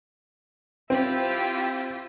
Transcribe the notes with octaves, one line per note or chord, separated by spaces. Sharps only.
C4 E4 F4 G4